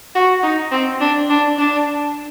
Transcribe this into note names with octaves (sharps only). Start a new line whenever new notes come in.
F#4
D#4
C4
D4
D4
D4